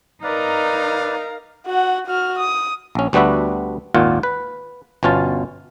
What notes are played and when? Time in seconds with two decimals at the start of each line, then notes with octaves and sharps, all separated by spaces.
0.24 D#4 A#4 B4 D5 F5 A#5
1.66 F#4 F#5
2.07 F#4 F6
2.39 D#6
2.95 A#1 C#4
3.13 D2 G3 B3 D4 F#4 E5
3.94 G#1 D#2 A#2 F4 F#5
4.23 B4
5.03 G1 B2 C#4 F4 A5